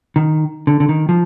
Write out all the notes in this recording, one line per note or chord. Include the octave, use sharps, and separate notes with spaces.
D#3
D3
D3
D#3
F3